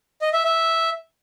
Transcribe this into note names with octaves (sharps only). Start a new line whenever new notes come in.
D#5
E5
E5